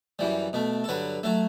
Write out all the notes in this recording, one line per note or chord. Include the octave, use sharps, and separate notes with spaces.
F#2 E3 G3
B2 A3
A4
G2 D3 F#3 B4
F#3 A3 A4